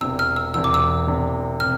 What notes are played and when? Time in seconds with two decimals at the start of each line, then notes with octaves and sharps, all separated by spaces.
0.01 E1 E2 C3 E6
0.19 F6
0.36 E6
0.54 E1 E2 C3 E6
0.64 D6
0.74 E6
1.07 E1 E2 C3
1.60 C3 F6